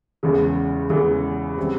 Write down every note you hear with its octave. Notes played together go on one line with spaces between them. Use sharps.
E2 C#3 E3 G#3
E2 C#3 E3 G#3
C#3 E3 G3 C4